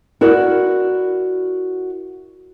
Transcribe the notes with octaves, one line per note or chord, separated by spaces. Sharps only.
E4 F#4 A#4 D5